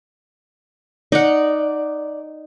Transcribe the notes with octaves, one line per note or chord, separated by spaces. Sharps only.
D#4 D5 F#5